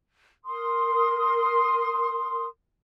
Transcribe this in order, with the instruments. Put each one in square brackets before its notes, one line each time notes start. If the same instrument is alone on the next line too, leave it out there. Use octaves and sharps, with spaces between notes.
[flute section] A#4 C6 D#6